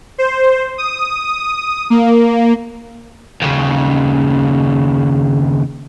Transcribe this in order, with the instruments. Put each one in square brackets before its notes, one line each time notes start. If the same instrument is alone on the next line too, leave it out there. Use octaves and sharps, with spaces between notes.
[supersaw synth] C5
D#6
A#3
[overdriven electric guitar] D#2 C#3